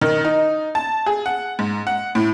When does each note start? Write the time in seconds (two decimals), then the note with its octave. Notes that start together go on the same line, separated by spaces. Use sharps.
0.01 D#3
0.25 D#4
0.75 A5
1.06 G#4
1.26 F#5
1.59 G#2
1.87 F#5
2.15 A2